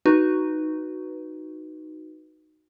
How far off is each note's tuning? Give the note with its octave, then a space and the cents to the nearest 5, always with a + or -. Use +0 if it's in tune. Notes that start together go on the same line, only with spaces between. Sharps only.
D#4 +0 F#4 +0 B4 +0